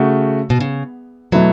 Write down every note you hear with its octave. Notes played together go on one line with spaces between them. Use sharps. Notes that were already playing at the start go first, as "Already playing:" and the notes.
Already playing: C#3 A3 F#4
B2
C#3
B2 F#3 A3 E4 B4